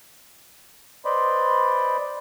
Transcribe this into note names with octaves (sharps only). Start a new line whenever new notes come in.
B4 C5 D5 D#5 B5 C6